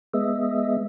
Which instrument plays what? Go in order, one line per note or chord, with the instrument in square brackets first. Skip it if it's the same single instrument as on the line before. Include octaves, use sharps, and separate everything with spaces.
[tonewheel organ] G#3 B3 D#5 E5